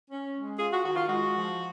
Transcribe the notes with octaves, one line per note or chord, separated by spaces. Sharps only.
C#4
G#3
F4 G#4
F#4
D#3 F#4
F4
G#3 F#4
F3